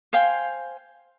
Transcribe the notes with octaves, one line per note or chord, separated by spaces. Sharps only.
C5 F5 G5 G#5